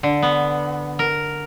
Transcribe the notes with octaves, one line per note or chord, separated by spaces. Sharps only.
D3
B3
A#4